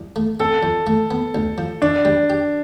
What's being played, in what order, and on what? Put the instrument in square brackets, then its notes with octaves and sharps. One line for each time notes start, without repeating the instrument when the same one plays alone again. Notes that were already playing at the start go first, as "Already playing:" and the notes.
Already playing: [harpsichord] C2
A3
[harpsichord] C4 [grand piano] A4
[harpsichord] F2
A3
B3
D2
F3
[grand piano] D4 [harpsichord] D5
[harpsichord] G3
G4